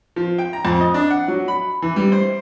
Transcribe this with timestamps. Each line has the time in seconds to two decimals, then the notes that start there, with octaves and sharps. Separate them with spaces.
0.16 F3
0.38 G5
0.53 A#5
0.65 F2
0.81 D#5
0.94 D4
1.10 F#5
1.28 F#3
1.48 B5
1.82 E3
1.96 G3
2.12 C5